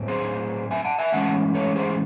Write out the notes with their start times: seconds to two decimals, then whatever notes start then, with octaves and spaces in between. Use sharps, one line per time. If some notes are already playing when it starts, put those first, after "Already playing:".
Already playing: A2 F#3 C4
0.08 G#4 C5
0.71 E5 G#5
0.85 F#5 A5
0.98 E5 G#5
1.12 A2 E3 G#3 C#4 F#5 A5
1.54 A4 C#5
1.76 G#4 C5